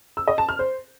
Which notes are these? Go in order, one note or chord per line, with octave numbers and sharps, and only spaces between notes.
E6
D#5
A5
F6
C5